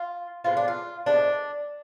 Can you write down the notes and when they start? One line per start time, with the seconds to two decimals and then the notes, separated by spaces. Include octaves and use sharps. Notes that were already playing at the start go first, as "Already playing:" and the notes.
Already playing: F4
0.44 A2 F3 G#3 B3 F4
0.57 D4
0.68 F4
1.06 A2 F3 G#3 B3 D4